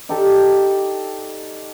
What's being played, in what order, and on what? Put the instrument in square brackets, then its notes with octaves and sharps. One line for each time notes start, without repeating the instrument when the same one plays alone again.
[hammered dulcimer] D#4 G4 A4 D5